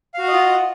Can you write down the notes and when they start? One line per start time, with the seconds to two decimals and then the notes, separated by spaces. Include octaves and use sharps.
0.14 F5
0.19 F#4
0.23 F#5
0.28 D#5
0.33 F4